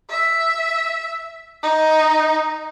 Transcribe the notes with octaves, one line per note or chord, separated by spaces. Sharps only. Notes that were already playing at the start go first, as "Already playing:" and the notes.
E5
D#4